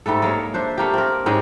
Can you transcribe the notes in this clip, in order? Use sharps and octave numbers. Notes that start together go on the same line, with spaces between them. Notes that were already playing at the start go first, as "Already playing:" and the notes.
G#2 G3 A3 A4
G#3 A#3 C#5
D4 C5 E5
A3 A#3 G4
C4 A#4
G#2 G#3 C#4 G4